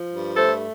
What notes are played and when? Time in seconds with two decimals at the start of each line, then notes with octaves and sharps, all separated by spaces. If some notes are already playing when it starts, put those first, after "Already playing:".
Already playing: F3
0.13 G2
0.37 A3 A4 C5